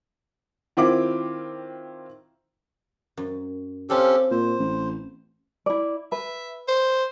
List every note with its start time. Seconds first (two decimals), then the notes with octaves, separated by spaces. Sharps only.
0.77 D#3 C4 E4 F4 D6
3.17 F#2
3.90 C4 C#4 F4 G4 A4
4.31 A#2 C5
4.60 A1
5.66 E4 D5
6.12 B4 E5
6.68 C5